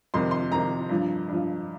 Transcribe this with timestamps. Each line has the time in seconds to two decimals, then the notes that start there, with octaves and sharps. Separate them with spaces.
0.14 F2 C3 D#3 C6
0.31 C6
0.51 F2 C3 D#3 A#5
0.89 G2 F3
1.28 G2 F3